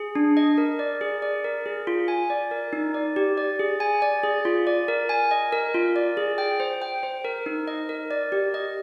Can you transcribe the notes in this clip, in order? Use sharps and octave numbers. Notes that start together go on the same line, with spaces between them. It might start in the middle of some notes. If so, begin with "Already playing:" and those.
Already playing: G#4
D4
D#5
A#4
D5
G#4
D5
A#4
G#4
F4
G#5
D5
A#4
D#4
D5
G4
D5
G#4
G#5
D5
G#4
F4
D5
A#4
G#5
D#5
A#4
F4
D5
G#4
G5
C5
G5
C5
A#4
D#4
D#5
A#4
D5
G4
D#5